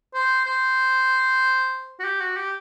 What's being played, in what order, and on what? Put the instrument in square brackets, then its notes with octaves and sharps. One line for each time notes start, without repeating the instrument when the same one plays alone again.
[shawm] C5
C5
F#4
G4
F#4
G4